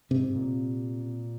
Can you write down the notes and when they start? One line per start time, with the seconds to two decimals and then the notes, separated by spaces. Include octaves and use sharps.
0.10 G#2 C3
0.28 G#2
0.36 A#2